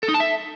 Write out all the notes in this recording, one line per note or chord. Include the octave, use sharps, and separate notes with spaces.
A4
D#4
A5
E5